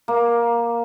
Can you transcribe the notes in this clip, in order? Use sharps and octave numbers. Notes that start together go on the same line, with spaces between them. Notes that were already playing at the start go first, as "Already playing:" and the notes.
A#3